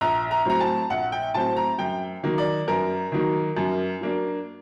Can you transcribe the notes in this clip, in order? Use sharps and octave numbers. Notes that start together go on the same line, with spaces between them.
A#1 A#5
A#5
A2 F#3 C4 A#5
A5
A#1 F#5
G5
A2 F#3 C4 A5
A#5
F#2 G5
D#3 F#3 A#3
D5
F#2 A#4
D#3 F#3 A#3
F#2
F#3 A#3 D4